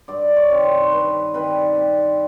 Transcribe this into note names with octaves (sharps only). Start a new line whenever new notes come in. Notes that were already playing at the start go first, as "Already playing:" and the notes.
G2 D5
C#5
D#3 G3 C4
C5
G2 B4
D#3 G3 C4 B4
C3